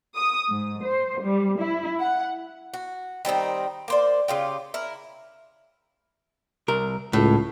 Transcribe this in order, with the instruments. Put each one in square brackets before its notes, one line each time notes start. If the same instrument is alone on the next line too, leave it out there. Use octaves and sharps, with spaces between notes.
[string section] D#6
G#2
C5
G3
E4
F#5
[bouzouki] F#4
D#3 G3 C4 D#4
A#3 C5 D5
C#3 F4 G4
E4 A#4
[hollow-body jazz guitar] C2 A#4
[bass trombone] C#2 [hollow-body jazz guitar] A2